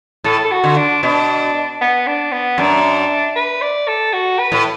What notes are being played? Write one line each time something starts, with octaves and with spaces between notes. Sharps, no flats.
A2 A4
A4
F#4
D3
D4
B2 D4
B3
D4
B3
F#2 D4
B4
D5
A4
F#4
B4
A2